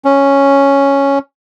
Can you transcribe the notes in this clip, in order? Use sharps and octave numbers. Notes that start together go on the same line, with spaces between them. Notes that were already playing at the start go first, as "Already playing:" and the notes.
C#4